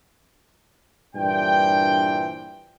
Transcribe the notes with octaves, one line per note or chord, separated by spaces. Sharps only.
G2 A#2 E3 D4 C5 G5